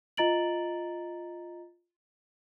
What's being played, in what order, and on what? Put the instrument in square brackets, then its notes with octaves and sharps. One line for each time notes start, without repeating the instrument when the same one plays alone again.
[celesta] F4 D#5 A#5 A6 D7 F#7